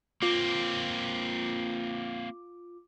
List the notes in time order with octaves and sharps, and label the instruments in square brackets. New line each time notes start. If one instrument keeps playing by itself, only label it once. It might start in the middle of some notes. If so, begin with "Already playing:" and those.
[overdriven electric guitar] A#3 C4 [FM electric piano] F4 D6